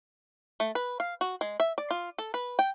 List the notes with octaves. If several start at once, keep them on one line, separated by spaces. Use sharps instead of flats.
A3
B4
F5
F#4
G#3
E5
D5
F4
A4
B4
G5